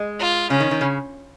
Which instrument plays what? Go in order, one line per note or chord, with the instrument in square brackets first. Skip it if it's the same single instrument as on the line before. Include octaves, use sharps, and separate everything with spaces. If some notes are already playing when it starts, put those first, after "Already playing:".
Already playing: [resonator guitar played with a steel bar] G#3
[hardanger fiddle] F4
[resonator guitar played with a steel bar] C#3 [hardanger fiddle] C#4
[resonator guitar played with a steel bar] D#3
D#3
C#3